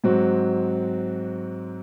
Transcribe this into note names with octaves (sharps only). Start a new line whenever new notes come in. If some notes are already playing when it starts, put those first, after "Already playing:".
G#2 F#3 C4 F#4